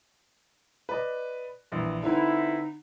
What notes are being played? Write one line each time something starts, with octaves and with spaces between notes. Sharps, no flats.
B4 D5 D#5
A#1 E3 E4
D3 C4 D#4 E4 B4